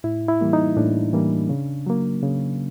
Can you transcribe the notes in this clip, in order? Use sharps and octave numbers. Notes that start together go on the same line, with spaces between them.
A2 E4
E4
E3 G3 A#3
D#4
A2 D4
E3 G3 A#3
C#3
F#3 A#3
C#3